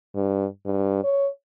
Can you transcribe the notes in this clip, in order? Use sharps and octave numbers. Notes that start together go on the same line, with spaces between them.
G2
G2
C#5